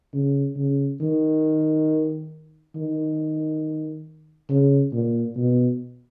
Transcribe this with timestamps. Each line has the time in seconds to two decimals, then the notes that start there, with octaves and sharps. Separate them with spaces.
0.13 C#3
0.56 C#3
1.01 D#3
2.76 D#3
4.50 C#3
4.93 A#2
5.37 B2